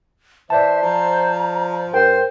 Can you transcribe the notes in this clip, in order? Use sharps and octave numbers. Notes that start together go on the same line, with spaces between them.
E3 C5 D5 E5 A5
F3 A#5
G2 A#4 C5 G5